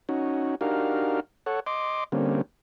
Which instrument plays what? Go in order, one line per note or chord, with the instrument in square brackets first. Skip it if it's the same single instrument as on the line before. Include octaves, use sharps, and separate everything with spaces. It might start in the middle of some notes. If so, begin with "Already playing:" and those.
[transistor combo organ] C#4 D#4 F#4
D4 D#4 F#4 G4 A#4 F5
A4 C#5 F#5
D#5 C6 D6
D3 G3 A#3 C4 C#4